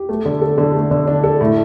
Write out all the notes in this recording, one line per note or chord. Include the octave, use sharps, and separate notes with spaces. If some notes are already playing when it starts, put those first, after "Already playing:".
Already playing: G4
A3
D3
A4
D3
A3
D3
D4
A4
A2